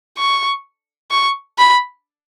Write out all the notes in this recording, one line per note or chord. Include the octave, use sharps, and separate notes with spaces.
C#6
C#6
B5